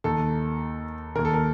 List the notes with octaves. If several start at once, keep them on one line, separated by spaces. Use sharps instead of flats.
D#2 D#3 A4
D#2 D#3 A#4
A4
A#4